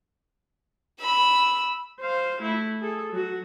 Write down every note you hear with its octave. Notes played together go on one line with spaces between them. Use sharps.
B5 E6
C5 F5
A3 E4
G#4 A4
F#3 F#4